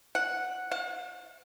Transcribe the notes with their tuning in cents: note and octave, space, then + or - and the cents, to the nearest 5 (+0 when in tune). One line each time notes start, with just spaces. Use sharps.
F#5 -5
F#5 -45